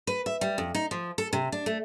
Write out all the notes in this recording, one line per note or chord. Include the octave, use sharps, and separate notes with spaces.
B4
E5
G3
F2
D#4
F3
A4
C3
D4
A3